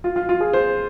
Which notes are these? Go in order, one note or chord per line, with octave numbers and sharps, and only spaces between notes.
F4
F4
F4
G#4
C5